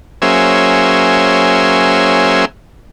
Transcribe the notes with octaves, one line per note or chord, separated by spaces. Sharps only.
F#3 A#3 C#4 G#4 C5 E5